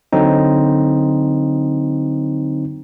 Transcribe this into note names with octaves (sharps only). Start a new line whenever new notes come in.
D3 F#3 C4 D#4